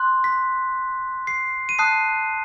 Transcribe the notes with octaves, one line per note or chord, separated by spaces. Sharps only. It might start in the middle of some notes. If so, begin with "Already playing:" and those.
Already playing: C6 F#6
B6
C7
D#7
A5 D#6 F#6 C7